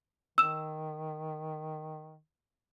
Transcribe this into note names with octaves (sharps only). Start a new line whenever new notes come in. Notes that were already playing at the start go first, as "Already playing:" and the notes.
D#3 E6 E7